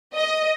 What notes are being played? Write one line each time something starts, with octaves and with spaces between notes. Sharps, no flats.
D#5